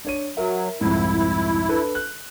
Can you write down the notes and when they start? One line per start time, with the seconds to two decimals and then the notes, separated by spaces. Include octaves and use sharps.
0.05 D4 C#5 D#7
0.37 F#3 A#4 E5
0.81 C2 F2 G#2 E4
1.69 D4 A4 B4
1.95 F#6